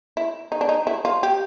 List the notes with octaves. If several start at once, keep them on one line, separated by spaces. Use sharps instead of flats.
E4
D#4
D4
D#4
E4
F4
G4